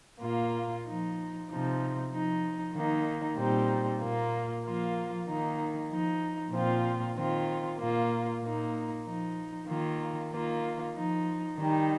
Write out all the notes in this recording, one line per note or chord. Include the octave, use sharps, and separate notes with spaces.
A#2 A#3 F4
F3 D#4
C3 F3 D#4
F3 D#4
D#3 A#3 D#4
A#2 G3 C4 D#4
A#2 A#3 F4
F3 A#3 F4
D#3 A#3 D#4
F3 D#4
A#2 F3 C4 F4
D#3 C4 F4
A#2 A#3 F4
A#2 A#3 D#4
F3 D#4
D#3 A#3 F4
D#3 A#3 F4
F3 D#4
D#3 G3 D#4